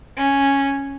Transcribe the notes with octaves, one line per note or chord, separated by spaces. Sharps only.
C#4